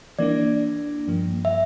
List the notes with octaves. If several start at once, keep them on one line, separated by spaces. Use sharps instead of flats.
E3 A#3 D4 D5
G2 F3 A#3
E5